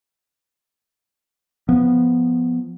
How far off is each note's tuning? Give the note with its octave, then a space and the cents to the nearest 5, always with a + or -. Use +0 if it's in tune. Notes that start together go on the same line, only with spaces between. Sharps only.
F3 +0 B3 +0